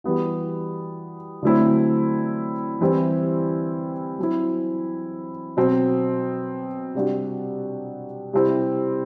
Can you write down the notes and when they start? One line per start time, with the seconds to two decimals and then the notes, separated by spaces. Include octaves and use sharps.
0.04 E3 G3 B3 F#4
1.43 D3 F#3 A3 C4 E4
2.81 E3 G3 C4 E4
4.19 F#3 C4 E4
5.57 B2 F#3 C4
6.95 C3 G3 D4 F#4
8.33 C3 G3 C4 E4